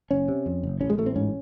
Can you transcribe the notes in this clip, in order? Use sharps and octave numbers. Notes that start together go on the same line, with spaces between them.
F#1 C#4
C3
F2
F#1
A1 C#4
G#3
A1 A3
C4
G#2 C#4